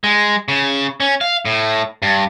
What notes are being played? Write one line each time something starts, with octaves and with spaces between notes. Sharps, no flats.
G#3
C#3
C#4
F5
A2
G2